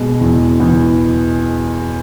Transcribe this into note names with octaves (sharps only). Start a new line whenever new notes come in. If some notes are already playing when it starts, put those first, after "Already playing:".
Already playing: B2 G#3
E2
E2